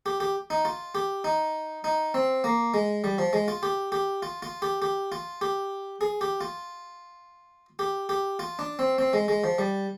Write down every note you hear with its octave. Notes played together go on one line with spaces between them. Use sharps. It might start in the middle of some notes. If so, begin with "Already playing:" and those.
G4
G4
D#4
F4
G4
D#4
D#4
C4
A#3
G#3
G3
F3
G#3
F4
G4
G4
F4
F4
G4
G4
F4
G4
G#4
G4
F4
G4
G4
F4
D4
C4
C4
G#3
G#3
F3
G3